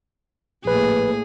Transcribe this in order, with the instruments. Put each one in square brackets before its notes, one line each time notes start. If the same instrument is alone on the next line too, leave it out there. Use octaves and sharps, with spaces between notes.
[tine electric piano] A#1 B4 [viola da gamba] A2 A#3 G#4